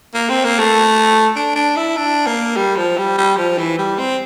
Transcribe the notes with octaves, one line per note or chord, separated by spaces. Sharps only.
A#3
C4
A#3
A3
D4
D4
E4
D4
A#3
G3
F3
G3
G3
F3
E3
G3
C4